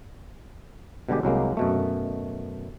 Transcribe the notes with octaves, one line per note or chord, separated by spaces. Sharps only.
B2 D3 G3 G#3 G4
C2 F#3 G#3 A#3
F#2 B2 A3